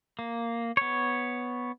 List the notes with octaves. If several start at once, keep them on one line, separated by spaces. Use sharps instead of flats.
A#3
B3 C#5